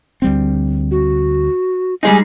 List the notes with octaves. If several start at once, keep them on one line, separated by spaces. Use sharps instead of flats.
D2 G3 C4
F#4
G3 G#3 D#4 G#5